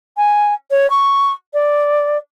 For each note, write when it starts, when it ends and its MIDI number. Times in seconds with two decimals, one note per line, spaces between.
0.17 0.53 80
0.71 0.89 73
0.90 1.33 85
1.53 2.17 74